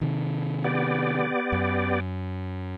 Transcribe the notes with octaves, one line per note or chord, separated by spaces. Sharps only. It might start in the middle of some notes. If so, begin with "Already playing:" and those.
C3 D#3
B3 G4 D5
F#2